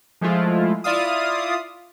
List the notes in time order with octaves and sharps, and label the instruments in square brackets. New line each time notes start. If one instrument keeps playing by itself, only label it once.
[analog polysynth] F3 G#3 A3 E4 F4
E4 F4 D5 E5 F5 D#6